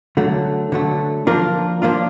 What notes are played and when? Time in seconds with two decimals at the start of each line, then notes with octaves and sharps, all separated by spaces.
0.17 D3 F#3 A3
0.72 D3 F#3 A3
1.27 F3 A#3 D4 F4 A#4
1.82 F3 A#3 D4 F4